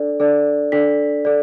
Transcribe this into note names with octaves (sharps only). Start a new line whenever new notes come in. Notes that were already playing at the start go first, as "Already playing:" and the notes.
Already playing: D4 A4 D5
D4 A4 D5
D4 A4 D5 B6
A4 D5